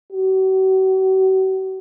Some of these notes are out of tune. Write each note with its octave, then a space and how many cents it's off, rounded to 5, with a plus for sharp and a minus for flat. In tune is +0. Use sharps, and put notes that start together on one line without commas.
F#4 +45